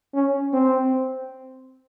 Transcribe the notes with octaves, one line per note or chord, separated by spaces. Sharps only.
C#4
C4